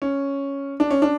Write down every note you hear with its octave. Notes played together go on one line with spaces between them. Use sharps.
C#4
D4
C#4
D4